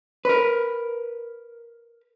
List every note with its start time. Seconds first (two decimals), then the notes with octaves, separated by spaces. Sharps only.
0.25 A#4 B4